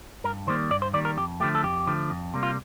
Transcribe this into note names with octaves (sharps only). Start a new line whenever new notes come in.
G2 A#4
D#3 G3 A#3 C5
G2 D5
C5
D#3 G3 A#3 D5
A#4
F2 G4
D3 F3 A3 G4
A4
F2 G4
D3 F3 A3
F2
C3 G3 A#3
F4